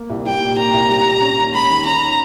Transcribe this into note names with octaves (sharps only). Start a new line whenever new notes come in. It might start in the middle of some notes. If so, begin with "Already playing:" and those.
Already playing: A#3
C2
G3 G5
A#2
A#3 A#5
C2
G3
A#2
C#4
D#2
G#3 B5
D#3
C#4 A#5